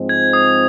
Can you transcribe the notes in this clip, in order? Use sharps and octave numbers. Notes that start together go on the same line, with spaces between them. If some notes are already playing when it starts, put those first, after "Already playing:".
Already playing: G#2 F3 G#3 C4
G#6
D#6